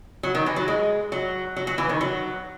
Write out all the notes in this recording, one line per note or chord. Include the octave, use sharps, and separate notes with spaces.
F#3
D#3
E3
F#3
G#3
F#3
F#3
F#3
E3
D#3
F#3